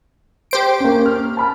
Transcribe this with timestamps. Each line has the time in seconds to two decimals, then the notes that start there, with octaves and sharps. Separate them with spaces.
0.51 G4 C5 D7
0.80 A#3 C#4
1.06 F6
1.37 A5 B5 F6